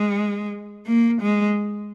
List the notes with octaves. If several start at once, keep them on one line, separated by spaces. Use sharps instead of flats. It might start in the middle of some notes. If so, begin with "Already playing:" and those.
Already playing: G#3
A#3
G#3